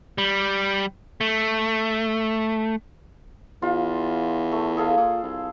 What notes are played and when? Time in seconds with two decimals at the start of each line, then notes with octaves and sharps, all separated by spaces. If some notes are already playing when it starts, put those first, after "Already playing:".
0.18 G3
1.21 A3
3.62 E2 F4
4.52 A3
4.77 G#4 A4 F5
4.97 A#2
5.23 C2